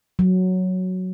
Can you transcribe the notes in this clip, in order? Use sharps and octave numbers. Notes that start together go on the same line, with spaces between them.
F#3